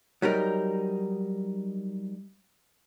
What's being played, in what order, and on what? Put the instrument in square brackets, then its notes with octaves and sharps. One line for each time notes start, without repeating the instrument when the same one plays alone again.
[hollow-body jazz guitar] F#3 G3 D#4 A#4